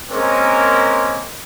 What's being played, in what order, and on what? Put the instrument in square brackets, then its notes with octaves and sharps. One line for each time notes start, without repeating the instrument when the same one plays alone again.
[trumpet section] G#3 A#3 C4 C#4 A#4